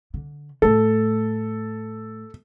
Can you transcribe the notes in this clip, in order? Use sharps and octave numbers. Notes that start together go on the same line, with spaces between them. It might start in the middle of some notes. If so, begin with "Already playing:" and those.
D3
A2 A3 A4